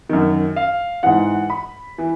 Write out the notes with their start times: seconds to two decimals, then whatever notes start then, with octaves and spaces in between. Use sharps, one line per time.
0.10 F#2 D#3
0.56 F5
1.03 G#2 E3 F#5
1.50 B5
1.98 E3